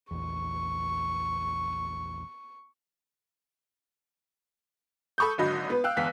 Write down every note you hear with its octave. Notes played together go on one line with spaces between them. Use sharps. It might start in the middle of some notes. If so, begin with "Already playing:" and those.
A#1 E2 C#6
A4 B5 C#6 D#6 G6
G#1 D3 F#3 D#5 B5
B3 B4
F5 G5 E6 F#6
G1 E2 F5 B6